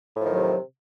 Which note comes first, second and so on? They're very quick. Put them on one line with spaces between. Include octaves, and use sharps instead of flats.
A2 F3 D#3 F#3 C3